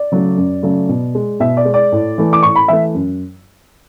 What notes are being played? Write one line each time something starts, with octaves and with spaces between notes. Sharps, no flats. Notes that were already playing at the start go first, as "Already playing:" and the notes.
Already playing: D5
C#3 F#3 A3
F#2
C#3 F#3 A3
B2
G#3
B2 E5
D5
G#3
D5
A2
E3 A3
D6
A2 C#6
B5
E3 A3 E5
F#2